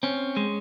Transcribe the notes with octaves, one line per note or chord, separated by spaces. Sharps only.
C4 C#4
G#3